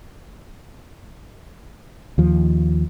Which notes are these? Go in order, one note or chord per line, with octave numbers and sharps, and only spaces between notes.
D#2 F3